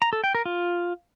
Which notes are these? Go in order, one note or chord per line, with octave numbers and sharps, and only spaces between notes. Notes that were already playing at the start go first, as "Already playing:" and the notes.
A#5
A4
G5
A#4
F4